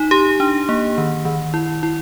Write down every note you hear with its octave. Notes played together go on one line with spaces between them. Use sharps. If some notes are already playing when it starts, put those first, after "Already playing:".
Already playing: D#4
G4
D4
A#3
D#3
D#3
E4
E4